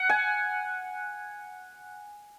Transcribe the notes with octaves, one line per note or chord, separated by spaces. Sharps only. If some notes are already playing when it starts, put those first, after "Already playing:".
Already playing: F#5
G#5